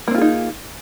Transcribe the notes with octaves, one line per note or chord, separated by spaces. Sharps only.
A#3 C4 D#4 F4 G#4